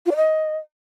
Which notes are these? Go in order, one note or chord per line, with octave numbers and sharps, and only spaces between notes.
F4
D5
D#5